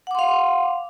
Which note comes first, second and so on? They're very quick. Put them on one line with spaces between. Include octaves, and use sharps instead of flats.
F#5 D6 C6 F5